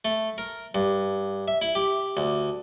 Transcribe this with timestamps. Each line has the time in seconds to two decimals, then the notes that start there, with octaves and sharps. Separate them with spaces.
0.05 A3
0.38 A#4
0.75 G2
1.48 E5
1.62 E4
1.75 G4
2.17 D2